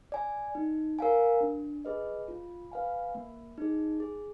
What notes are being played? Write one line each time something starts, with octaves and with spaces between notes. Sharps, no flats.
D5 G#5
D#4
A#4 F5 G#5
D4
G#4 B4 D#5
F4
B4 F5 G#5
A#3
D#4 G#4
G#4